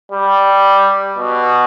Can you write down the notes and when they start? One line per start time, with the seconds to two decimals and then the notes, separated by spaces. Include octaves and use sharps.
0.12 G3
1.18 B2